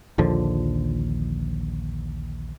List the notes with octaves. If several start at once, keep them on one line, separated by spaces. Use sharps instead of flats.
A#1 D#2 D3 F3